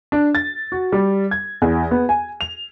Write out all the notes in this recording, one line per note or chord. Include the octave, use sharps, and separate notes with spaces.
D4
A6
F#4
G3
G#6
E2
B3
G#5
F7